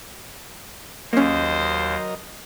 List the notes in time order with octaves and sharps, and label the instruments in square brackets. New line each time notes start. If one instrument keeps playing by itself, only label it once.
[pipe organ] D#2 [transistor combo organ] F#3 A#4 D#5 [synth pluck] A#3 C#4 [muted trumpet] C5